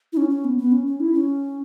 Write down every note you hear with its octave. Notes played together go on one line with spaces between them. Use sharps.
E4
C#4
C#4
B3
B3
C#4
C#4
E4
C#4